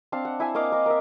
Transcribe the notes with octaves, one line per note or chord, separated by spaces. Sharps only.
C4 D4 F5 A5
F#5
E4 E5 G#5
A#3 D#5 F5 D6
A#4
A#4 E5